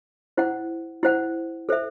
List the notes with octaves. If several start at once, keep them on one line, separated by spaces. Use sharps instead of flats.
E4 C5 F#5
E4 C5 F#5
A4 C5 E5